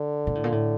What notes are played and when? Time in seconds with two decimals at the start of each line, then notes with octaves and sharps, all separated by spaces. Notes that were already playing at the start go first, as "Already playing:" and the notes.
Already playing: D3
0.27 A#2
0.35 A2
0.44 A#2
0.52 A2